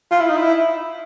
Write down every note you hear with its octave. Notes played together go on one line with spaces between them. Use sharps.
F4
E4
D#4
E4